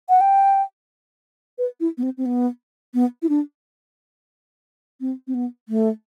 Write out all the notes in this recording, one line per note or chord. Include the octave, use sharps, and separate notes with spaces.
F#5
G5
B4
E4
B3
C4
C4
B3
B3
E4
D4
C4
C4
B3
A3